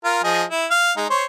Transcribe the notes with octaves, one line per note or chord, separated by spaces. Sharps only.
F4 A#4
F3 G#4 D#5
E4
F5
G#3 D#4
C5 C#5